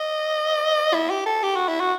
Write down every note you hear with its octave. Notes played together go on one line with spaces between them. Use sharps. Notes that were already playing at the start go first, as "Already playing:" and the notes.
Already playing: D#5
E4
G4
A4
G4
F#4
E4
F#4